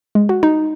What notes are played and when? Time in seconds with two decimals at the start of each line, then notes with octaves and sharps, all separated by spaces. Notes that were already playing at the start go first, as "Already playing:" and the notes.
0.15 G#3
0.29 F#4
0.43 D#4